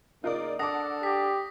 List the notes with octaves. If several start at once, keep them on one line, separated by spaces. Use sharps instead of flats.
C#3 A#3 D#4 F4 A#4 D5
D4 A4 F#5 A5 D6 D#6 A#6
G4 A#6 B6